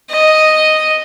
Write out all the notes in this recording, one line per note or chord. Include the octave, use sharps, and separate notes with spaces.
D#5